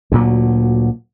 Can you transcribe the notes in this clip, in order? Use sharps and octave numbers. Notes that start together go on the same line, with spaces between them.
D2 A#2 F#3